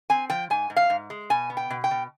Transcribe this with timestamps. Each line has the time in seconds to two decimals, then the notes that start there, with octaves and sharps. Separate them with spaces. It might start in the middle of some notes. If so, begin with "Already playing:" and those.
0.10 C4 G#5
0.30 F3 G5
0.50 G#2 G#5
0.70 G#2
0.76 F5
0.90 G#2
1.10 G#3
1.30 B2 G#5
1.50 B3
1.57 G5
1.70 B2
1.84 G5
1.91 B2